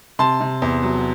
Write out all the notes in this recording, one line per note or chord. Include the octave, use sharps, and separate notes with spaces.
C3 A5 C6
C3
E2
F#3